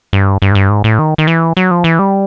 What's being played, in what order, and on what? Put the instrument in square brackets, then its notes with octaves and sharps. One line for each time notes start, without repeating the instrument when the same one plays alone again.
[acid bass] G2
G2
G#2
G2
G#2
A2
D#3
D#3
E3
F#3
F3
E3
G3